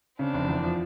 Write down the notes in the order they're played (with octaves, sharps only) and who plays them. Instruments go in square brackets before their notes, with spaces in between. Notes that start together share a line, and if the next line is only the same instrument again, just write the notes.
[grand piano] C#3 [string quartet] C4 D4
[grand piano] F1
E2
F3